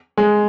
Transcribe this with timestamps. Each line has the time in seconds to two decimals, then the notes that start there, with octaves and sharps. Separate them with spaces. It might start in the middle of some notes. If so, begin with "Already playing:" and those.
0.17 G#3